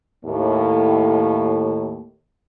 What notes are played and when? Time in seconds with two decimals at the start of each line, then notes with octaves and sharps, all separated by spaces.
0.25 D#2 A2